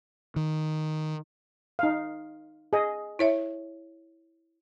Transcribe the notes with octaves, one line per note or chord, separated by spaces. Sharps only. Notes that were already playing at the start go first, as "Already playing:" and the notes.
D#3
D#4 F5
G#4 D#5
E4 C#5 E5